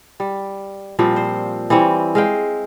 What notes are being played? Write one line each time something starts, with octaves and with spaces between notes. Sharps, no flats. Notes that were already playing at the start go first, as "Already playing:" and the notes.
G3
A#2 F3 G3 C4
C5
E3 G3 C4 C#5
G#3 F5 G5